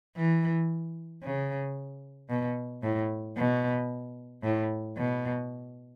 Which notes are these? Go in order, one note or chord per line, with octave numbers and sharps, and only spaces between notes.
E3
C#3
B2
A2
B2
A2
B2